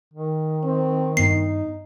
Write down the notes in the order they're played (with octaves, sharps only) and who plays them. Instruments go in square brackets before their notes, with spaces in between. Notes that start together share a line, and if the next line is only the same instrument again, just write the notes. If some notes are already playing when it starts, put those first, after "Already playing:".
[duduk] D#3
[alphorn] C4
[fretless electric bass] G2 B3 [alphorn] D#4 [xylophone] C7